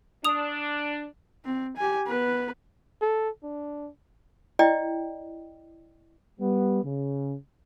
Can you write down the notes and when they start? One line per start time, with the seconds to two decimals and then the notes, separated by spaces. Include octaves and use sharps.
0.25 D4 D#6 F7
1.45 C4
1.77 G4 G#5
2.07 B3 B4
3.01 A4
3.43 D4
4.59 E4 D5 D#5 G5
6.40 G3 B3
6.84 C#3